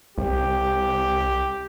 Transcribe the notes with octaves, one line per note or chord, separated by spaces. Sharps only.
C2 G4